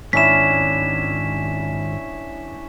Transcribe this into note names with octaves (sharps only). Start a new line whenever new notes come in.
G#2 D#3 C#4 D4 E4 B6 E7